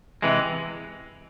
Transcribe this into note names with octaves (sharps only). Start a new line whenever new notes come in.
C3 E3 G#3